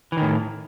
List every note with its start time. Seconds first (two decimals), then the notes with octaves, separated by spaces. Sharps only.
0.12 E3
0.17 D#3
0.22 A2